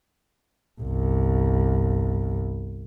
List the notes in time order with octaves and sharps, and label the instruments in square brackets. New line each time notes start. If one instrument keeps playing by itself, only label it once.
[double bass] G1 C2